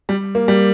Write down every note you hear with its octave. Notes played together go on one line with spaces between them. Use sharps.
G3
A#3
G3